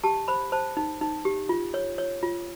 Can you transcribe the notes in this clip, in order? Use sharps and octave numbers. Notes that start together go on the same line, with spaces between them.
G4 A5
C5 B5
C5 A5
D#4
D#4
G4
F4
C#5
C#5
F4